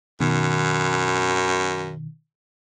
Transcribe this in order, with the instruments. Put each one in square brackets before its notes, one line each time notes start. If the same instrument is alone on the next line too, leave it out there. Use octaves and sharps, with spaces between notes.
[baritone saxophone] F#2 [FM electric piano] B2 D#3